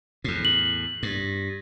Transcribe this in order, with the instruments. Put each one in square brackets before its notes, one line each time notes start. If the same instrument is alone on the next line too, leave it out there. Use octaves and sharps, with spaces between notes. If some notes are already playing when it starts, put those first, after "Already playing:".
[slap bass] E2 A2
[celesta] F#7
[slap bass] G2